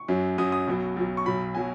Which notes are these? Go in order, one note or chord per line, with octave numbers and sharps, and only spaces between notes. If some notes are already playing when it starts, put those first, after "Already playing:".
Already playing: C#6
F#2 F#3
F#2 F#3 D#6
D#6
B1 B2 F#3
B1 B2 F#3
C#6
B1 B2 F#3 B5
B2 F#3 G#5